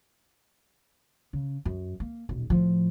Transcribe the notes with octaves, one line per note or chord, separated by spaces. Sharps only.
C#3
F#2
A#3
D#1 B1
A2 F3